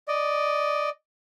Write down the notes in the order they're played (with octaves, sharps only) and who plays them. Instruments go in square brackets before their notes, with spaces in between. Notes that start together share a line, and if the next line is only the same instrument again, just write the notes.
[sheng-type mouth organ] D5 D#5